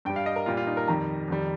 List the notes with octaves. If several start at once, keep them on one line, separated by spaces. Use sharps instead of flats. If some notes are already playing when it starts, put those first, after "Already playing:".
G2 G3 G5
F5
D#5
A#4
A#2 G3 F4
F4
D#4
A#4
F2 D#3 G3 A#5
F2 D#3 G3